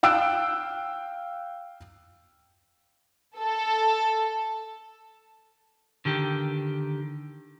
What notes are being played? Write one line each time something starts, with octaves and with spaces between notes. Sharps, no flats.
F5 G5 E6 F#6 D7
A4
D3 D#3 G4